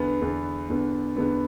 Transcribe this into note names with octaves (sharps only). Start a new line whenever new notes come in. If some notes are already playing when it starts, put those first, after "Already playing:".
Already playing: E2 D3 B3
E2 D3 B3
E2 D3 B3
E2 D3 B3